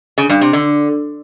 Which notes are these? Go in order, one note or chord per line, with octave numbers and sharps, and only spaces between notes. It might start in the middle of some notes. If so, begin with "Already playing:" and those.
C#3
G2
C3
D3